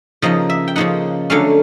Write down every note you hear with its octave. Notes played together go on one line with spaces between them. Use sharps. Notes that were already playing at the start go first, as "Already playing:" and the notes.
C#3 F3 A#3 D#4 D#5
E5
G5
C#3 F3 A#3 D#4 F#5
D3 F#3 A3 C#4 F5